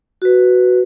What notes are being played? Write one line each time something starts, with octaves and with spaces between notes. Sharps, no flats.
F#4 B4